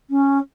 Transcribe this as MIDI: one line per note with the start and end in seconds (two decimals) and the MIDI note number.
0.10 0.39 61